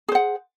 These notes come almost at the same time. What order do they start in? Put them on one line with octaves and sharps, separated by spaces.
G#4 C5 F#5